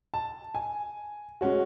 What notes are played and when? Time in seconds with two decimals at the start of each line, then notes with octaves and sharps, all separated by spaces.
0.14 A5
0.55 G#5
1.41 G#3 C#4 F#4